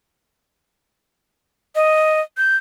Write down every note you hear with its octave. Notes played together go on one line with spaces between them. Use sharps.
D#5
G6